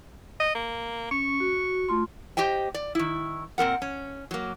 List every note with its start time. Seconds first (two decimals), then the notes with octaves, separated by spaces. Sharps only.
0.40 D#5
0.55 A#3
1.11 C#4 C#6
1.40 F#4
1.89 A3 F4 C6
2.37 G4 C5 D#5 G5
2.74 D5
2.95 D#3 E4
3.58 A#2 C4 A#4 F#5
3.82 C#4
4.31 F#3 A#3